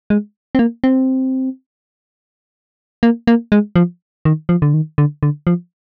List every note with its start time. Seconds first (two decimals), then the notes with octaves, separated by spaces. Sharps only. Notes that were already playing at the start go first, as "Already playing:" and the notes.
0.10 G#3
0.55 C4
0.59 A#3
0.84 C4
3.03 A#3
3.27 A#3
3.52 G#3
3.76 F3
4.25 D#3
4.49 F3
4.62 D3
4.74 D#3
4.98 D3
5.23 D3
5.47 F3